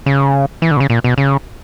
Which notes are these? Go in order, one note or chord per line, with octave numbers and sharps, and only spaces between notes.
C#3
E3
D3
B2
C#3
A#2
B2
C#3